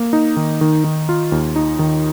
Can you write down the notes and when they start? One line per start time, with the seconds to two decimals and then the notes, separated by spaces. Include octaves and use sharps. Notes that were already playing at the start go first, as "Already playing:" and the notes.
Already playing: A#3
0.13 D#4
0.37 D#3
0.61 D#3
0.84 D#3
1.09 F4
1.32 D#2
1.56 D#4
1.79 D#3